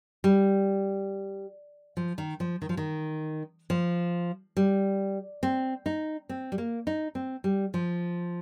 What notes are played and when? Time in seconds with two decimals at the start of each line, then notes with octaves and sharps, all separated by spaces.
0.24 G3
1.97 F3
2.18 D#3
2.40 F3
2.62 D#3
2.69 F3
2.77 D#3
3.70 F3
4.57 G3
5.43 C4
5.86 D#4
6.29 C4
6.52 G3
6.58 A#3
6.87 D#4
7.15 C4
7.44 G3
7.74 F3